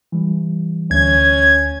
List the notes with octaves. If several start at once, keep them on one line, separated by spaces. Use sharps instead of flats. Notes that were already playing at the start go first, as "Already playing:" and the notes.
E3 G3
D2 C#4 G#6